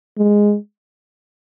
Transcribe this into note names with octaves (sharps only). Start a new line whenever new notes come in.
G#3